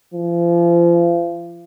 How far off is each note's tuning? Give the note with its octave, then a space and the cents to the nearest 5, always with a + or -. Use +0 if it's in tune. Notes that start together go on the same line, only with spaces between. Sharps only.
F3 -35